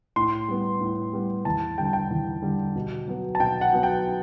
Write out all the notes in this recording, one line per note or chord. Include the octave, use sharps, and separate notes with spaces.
A2 C6
G3 B3
A2
G3 B3
E2 A5
D3 G3 G5
A5
G5
E2
D3 G3
B2
F#3 B3
A5
B2 G5
F#5
F#3 B3
G5